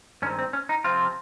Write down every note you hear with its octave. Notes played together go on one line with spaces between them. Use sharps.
G2 D#3 G#3 C4 C#4
C4
C#4
D#4
C3 F3 C4 F4